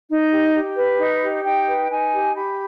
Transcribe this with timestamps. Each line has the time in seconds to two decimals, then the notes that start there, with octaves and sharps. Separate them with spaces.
0.08 D#4
0.31 G4
0.54 G4
0.76 B4
0.99 D#4
1.22 G4
1.44 D#4 G5
1.67 B4
1.91 D#4 G#5
2.13 G4
2.35 G4 B5